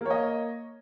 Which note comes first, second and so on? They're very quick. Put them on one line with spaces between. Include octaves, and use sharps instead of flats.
A#3 C#5 D#5